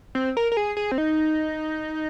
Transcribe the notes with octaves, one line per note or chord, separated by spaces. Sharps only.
C4
A#4
A#4
G#4
G#4
C4
D#4